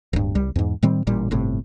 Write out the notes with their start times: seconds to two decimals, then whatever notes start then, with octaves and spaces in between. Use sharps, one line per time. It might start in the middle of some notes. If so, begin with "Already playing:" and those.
0.13 D1 G2
0.35 C2 G3
0.56 E2 G#2
0.83 A2 D#3 G3 C4
1.07 A1 A#2 G3
1.31 G1 A2 C3